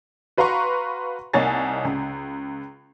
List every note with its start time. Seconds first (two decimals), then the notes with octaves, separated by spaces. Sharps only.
0.37 F#4 B4 F5 A#5 C6 C#6
1.34 C2 A#3 D#4 C#5 G#5 A6
1.85 C#2